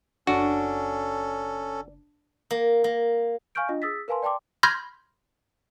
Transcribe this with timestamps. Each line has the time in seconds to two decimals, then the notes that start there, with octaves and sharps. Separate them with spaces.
0.27 F#1 C#4 D4 F#4 A4
2.51 A#3
2.84 A#3
3.55 F5 G#5 C#6 F6 G6 D7
3.69 D4 F4 D#5
3.82 G#4 D#6 E6 A6 B6
4.08 A#4 B4 F5 G#5 A5 C6
4.22 D5 G5 A5 C6 D6
4.63 B5 C6 F6 G6 G#6 A#6